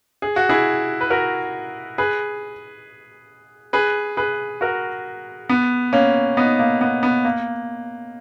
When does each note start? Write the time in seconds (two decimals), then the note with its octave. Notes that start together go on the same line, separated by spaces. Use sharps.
0.22 G#4
0.36 F#4
0.49 E4 G#4
1.01 B4
1.10 F#4 A#4
1.98 G#4 B4
3.73 G#4 B4
4.17 G#4 B4
4.61 F#4 A#4
5.49 B3
5.93 A#3 C#4
6.37 B3 D#4
6.59 A#3
6.81 B3
7.03 B3
7.25 A#3